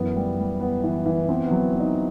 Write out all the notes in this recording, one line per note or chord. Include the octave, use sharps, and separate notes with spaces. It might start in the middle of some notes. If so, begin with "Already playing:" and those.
Already playing: F#2 E3 B3
G3
G3
B3
E3
E3
B3 C4
B3
F#3
B3
D#4